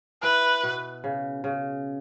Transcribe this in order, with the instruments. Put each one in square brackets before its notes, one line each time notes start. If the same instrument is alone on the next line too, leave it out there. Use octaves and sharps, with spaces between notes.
[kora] E4 [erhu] B4
[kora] B2
C#3
C#3